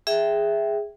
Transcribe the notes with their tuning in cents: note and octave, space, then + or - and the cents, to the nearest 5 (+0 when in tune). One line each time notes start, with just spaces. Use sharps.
G#4 -5 E5 +0 G5 +0